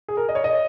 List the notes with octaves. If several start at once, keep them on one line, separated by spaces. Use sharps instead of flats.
G#4
A#4
D#5
C#5
D#5